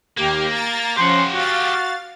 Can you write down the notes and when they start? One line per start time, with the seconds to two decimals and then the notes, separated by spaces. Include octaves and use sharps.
0.17 D#2 A#3 G4
0.51 A#5 A6
0.97 F3 C#4 G4 F#5 C6
1.35 F#4 F5 A6